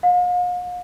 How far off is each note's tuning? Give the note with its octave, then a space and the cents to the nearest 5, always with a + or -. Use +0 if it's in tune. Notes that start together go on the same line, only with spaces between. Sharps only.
F5 +45